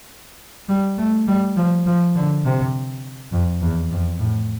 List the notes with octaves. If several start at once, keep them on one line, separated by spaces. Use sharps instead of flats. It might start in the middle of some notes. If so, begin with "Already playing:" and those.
G3
A3
G3
F3
F3
D3
C3
F2
E2
F2
A2